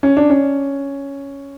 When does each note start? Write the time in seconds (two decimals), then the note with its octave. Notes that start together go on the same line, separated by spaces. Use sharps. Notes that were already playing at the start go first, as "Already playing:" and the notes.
0.03 C#4
0.17 D4
0.30 C#4